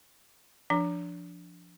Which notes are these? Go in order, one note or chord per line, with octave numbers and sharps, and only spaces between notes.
F3 D4